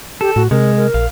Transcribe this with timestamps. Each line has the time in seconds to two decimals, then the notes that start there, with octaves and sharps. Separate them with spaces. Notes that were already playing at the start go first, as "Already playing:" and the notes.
0.21 G4 A4
0.36 A2 F#4
0.51 C3 G#3 A#4
0.76 A#4
0.94 A#1 F5